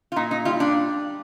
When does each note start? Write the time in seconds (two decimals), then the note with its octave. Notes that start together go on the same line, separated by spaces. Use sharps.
0.12 F4
0.16 A#2 D#4
0.31 D#4
0.45 G3 F4
0.60 D4